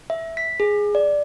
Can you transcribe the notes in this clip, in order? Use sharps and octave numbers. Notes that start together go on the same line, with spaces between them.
E5
B6
G#4
D5